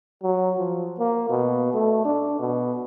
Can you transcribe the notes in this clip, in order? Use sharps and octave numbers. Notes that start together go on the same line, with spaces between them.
F#3
F3
A#3
B2
A3
D4
B2